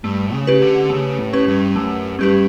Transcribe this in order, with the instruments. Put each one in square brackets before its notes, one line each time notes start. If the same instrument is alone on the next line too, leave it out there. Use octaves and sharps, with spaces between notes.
[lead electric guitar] G2 [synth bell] A3
[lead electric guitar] C#3
[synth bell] C#4 G4 B4
[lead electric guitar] D3
[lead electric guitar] C#3 [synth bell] A3
[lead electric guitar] A2
[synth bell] C#4 G4 B4
[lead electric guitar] G2
[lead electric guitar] F#2 [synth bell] A3
[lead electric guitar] G2 [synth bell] C#4 G4 B4